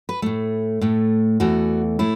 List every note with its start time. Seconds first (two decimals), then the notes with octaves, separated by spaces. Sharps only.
0.09 B4
0.22 A2 A3
0.81 A2 A3
1.40 E2 E3 A3 F#4
1.99 A2 A3 E4